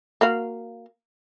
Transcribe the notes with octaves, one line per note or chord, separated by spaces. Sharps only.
A#3 F#4 F5